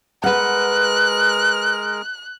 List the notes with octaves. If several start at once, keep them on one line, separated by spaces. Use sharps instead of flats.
G#3 A#4 B4 F#5 F#6